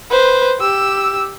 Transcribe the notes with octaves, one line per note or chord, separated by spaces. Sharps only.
B4 C5
G4 E6